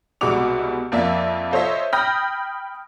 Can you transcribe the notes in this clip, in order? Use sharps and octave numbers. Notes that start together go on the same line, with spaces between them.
C2 B2 G#3 F#4 D6 F7
F2 A#3 D5 E5
F4 A4 C5 C#5 D#5 E5
G5 B5 D#6 F6 G6 A#6